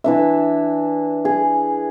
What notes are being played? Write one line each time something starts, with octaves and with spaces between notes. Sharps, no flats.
E3 D4 E5
G#4